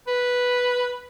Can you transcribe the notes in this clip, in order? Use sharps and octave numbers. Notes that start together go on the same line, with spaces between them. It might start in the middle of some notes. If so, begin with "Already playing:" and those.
B4